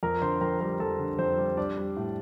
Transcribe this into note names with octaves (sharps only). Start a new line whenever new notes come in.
F2 A#4 A#5
D3 C5 C6
F2 A#4 A#5
G3 A#4 A#5
F2 A4 A5
D3
F2 C4 C5
G3
G3 D4 D5
G3
A2